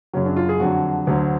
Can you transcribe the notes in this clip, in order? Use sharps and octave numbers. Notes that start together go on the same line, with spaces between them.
F#2 C#3 F#3 C#4
D4
F4
G#4
F2 D3 F#3 F#4
D2 D3 F#3